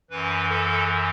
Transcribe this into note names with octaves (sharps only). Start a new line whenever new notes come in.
F#2 E3 B4
A4